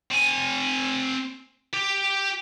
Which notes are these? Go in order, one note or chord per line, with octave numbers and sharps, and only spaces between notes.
C4 G#5
G4